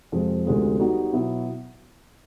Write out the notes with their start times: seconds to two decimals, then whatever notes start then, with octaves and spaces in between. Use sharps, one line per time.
0.12 F2 C3 F3 G#3 C4
0.46 D2 C3 F3 G#3 B3
0.80 G3 B3 D#4 F#4
1.13 B2 F#3 B3 E4